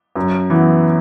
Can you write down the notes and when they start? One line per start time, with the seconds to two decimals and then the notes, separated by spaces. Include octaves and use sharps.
0.15 F#2
0.50 E3 B3